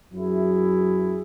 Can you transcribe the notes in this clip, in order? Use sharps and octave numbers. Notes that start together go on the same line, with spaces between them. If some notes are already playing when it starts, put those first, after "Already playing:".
F#2 F#3 E4 G#4